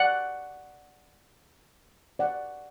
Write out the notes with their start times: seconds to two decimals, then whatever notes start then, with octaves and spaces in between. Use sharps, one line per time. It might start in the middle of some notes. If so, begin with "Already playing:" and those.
Already playing: D5 F#5
2.19 D5 F#5